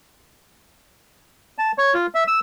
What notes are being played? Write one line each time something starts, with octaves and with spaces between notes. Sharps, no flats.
A5
C#5
F4
E5
E6